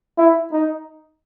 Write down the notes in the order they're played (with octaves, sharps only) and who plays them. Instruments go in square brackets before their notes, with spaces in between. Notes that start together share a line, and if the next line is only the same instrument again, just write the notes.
[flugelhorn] E4
D#4